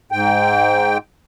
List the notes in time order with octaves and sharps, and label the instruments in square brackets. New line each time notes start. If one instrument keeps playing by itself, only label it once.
[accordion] G#2 G5